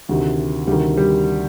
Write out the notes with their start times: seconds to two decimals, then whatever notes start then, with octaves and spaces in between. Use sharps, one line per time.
0.09 D2 C3 D#3
0.67 D2 C3 D#3 G3
0.97 G3